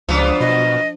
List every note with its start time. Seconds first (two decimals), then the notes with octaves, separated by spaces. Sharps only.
0.09 C#2 F3 F#3 B3 D4 F4
0.41 B2 D#5